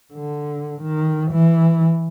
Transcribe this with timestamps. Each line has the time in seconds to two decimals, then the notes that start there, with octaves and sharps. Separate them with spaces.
0.14 D3
0.82 D#3
1.31 E3